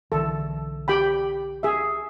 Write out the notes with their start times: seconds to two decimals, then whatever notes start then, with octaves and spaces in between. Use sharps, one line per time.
0.12 B1 D3 E3 A4
0.88 G4 G5 B5
1.63 G#4 E5